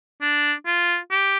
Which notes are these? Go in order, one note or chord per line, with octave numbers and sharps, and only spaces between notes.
D4
F4
G4